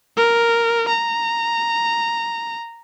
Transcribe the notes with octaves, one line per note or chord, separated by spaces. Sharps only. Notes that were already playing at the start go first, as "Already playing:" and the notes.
A#4
A#5